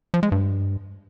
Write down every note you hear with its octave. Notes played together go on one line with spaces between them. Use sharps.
F3
G#3
G2